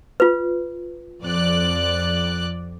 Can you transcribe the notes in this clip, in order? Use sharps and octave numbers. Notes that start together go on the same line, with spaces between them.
F4 B4
F2 D5 F#6